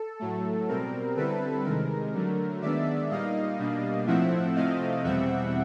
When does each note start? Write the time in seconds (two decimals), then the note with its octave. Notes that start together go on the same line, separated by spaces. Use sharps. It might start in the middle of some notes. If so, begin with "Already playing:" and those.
Already playing: A4
0.20 A2 F#3 A3
0.68 B2 G3 C4 A#4
1.16 D3 G3 C4 E4 A4 B4
1.65 C3 D#3 G#3 A#4
2.13 D3 F#3 A3
2.62 D#3 G#3 B3 D4 D5 E5
3.10 A#2 G3 A#3 D#4 D#5 F5
3.59 B2 G3 A#3 D4
4.07 A2 F3 A3 C4 E4 E5 F#5
4.55 C3 F3 A3 C4 E4 D#5 F5
5.04 E2 B2 G3 C4 E5 F#5